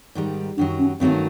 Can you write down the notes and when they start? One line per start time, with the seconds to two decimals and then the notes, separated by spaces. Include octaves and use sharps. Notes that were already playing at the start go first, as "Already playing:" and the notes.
0.15 G#2 D#3 G3
0.57 F#2 D#3 F#3 D4
0.79 C#4
1.00 G2 D#3 F#3 A3 C4 C#4